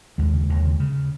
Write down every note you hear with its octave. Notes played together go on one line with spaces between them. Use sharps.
D#2 G#3
C#3
D#2
C#3
C#3